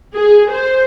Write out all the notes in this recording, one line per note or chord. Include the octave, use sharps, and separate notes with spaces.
G#4
C5